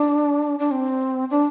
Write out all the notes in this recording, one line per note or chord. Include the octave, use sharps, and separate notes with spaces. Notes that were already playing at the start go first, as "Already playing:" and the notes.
Already playing: D4
D4
C4
D4